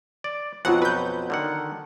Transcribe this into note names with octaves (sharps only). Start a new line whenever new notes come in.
D5
F2 B2 F#3 F4 F#5
B4 G6
D3 D#3 F#5